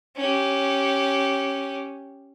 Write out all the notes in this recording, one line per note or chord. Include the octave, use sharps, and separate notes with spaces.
C#4 G4